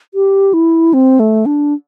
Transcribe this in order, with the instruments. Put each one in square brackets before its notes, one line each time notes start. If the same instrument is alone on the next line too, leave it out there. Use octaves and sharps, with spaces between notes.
[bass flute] G4
E4
C4
A3
D4